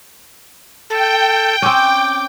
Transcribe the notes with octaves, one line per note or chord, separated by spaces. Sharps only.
A4 G5
C4 C#4 D6